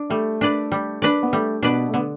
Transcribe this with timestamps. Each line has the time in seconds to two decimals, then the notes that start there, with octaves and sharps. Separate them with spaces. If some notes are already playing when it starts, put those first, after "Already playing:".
Already playing: D4
0.10 G3 A3
0.41 D4 B4 D5
0.72 G3
1.02 D4 B4 D5
1.23 B3
1.33 G3 A3
1.63 B2 D4 B4 D5
1.89 A3
1.94 D3 B3